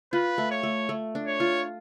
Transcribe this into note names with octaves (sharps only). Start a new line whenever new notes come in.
F4 B4
A3
C#5
A3
A3
D4
C#5
F4